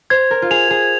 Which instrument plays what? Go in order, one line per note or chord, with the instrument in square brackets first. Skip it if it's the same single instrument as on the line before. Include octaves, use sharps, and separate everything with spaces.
[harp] C5 [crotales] G#6
[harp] A#4
F4
[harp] G#4 [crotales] F7
[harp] G#4